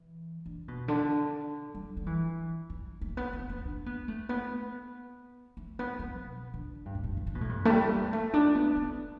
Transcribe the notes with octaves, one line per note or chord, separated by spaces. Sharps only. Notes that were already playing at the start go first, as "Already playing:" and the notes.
Already playing: E3
D3
B2
D3
G3
G3
E3
G3
A3
B3
B3
B3
D4
B3
A3
B3
A3
B3
G3
B2
D3
G2
A2
G2
E2
D3
B2
A2
G2
A3
G3
G3
A3
D4
B3
B3